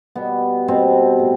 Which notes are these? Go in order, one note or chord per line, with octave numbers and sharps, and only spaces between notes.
B2 G3 B3
B2 G3 C4
A2